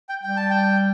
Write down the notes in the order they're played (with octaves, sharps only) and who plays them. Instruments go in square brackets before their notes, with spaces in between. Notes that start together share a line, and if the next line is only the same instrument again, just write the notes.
[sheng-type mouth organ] G5
[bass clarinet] G3 [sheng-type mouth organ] G5
[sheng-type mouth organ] A5
G5